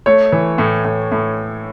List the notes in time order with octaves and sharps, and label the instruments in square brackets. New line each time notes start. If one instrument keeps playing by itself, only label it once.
[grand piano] A3 [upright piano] C#5
[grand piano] E3
A2
A2
A2